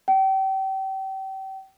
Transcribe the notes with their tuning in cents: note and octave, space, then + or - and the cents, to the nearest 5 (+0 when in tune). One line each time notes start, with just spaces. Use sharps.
G5 -35